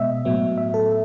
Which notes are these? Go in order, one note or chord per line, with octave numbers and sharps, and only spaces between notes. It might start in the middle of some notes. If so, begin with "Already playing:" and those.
Already playing: B2 G#3 B3 D#5 E5
A2 F#3 B3
E5
A4